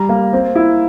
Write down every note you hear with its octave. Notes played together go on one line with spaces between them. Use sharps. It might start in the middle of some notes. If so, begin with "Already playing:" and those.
Already playing: G3 A#5
A#3
C4
E4